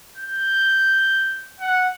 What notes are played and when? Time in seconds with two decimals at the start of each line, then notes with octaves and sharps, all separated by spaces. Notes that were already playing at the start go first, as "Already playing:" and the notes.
0.18 G6
1.60 F#5